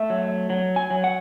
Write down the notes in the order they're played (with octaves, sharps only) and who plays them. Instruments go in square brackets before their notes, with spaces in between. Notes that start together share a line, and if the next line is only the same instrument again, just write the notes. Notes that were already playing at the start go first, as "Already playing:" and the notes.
Already playing: [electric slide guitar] A3 E5
F#3
F#3
G#5
F#3
F#5